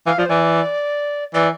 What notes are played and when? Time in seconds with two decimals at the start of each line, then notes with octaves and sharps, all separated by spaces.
0.07 E3 F5
0.18 F3 D5
0.26 C5
0.30 E3 D5
1.34 E3 D5